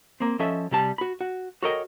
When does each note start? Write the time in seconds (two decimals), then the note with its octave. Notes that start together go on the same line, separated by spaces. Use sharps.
0.20 A#3 C4
0.39 F3 C#4 A4 D#5 E5
0.71 C3 G3 A5
0.98 F#4 B5
1.21 F#4
1.62 F#4 A4 A#4 C#5 D#5 G5